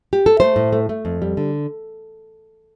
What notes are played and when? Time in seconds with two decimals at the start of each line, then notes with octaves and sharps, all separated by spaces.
0.13 G4
0.26 A4
0.40 A3 C5
0.56 A2
0.73 A3
0.89 A3
1.05 F2
1.22 G3
1.37 D3